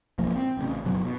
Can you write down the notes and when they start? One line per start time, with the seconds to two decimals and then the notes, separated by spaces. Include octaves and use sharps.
0.18 B1 G#2 F3 A#3
0.36 C4
0.57 A1 C#3
0.85 F#1 B2 F#3
1.05 B2